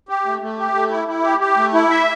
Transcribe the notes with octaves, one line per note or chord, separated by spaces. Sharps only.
G4
A3
A3
G4
A3
E4
E4
G4
G4
A3
E4
E5